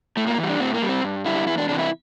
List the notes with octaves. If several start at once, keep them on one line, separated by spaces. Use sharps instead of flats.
A2 A3
A#3
E3
G3
D4
A2 C4
A#3
G3
C4
G2
D3 G3 E4
E2 E4
D4
C3 E3 D4
E4